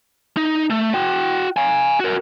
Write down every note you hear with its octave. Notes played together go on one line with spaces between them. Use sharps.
D#4
A3
F#4 G5
F5 G#5
F#4 A#4